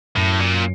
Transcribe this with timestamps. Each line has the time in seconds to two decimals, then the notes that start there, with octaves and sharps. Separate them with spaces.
0.16 F#2 A2
0.40 A#2